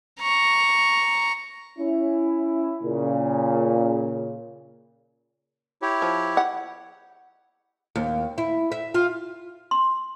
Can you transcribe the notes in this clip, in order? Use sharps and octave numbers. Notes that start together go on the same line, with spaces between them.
A#5 C#6
C#4 E4
A#2 C#3
E4 G4 C#5
F3
F#5
D#2
E4
E5
F4
C6